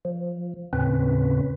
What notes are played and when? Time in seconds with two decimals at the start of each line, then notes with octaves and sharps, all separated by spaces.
0.05 F3
0.73 D#2 A2 C#3 C4 C#4 B4